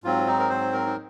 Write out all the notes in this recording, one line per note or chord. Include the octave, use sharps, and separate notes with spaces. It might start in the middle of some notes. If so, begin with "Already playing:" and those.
G#2 F#3 C4 F4
D#4
A#4
C5
A#4
D#4